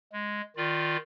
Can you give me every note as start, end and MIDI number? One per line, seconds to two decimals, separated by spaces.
0.13 0.42 56
0.57 0.97 51
0.57 0.97 65
0.57 0.97 74